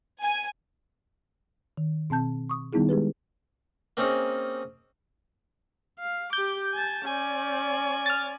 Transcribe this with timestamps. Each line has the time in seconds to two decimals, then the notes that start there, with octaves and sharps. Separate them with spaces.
0.21 G#5
1.77 D#3
2.10 B2 C4 A5 G6
2.49 C#6 D#6
2.73 D#3 G3 B3 D#4 E4 G#4
2.89 G#3 G4 G#4 B4
3.97 A#3 C4 C#4 D#4 G#4
5.99 F5
6.33 G4 D6 G6
6.74 G#5 A5
7.07 C#4 D5 G#5
8.06 F6 A6